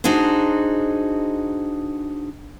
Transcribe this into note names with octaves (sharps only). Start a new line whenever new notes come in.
D4 D#4 F#4 G#4 C5